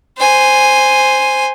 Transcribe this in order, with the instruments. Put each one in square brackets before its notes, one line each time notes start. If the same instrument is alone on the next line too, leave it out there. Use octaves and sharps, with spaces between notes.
[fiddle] C5 G#5